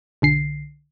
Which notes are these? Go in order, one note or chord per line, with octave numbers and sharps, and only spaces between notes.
B1 D3 C7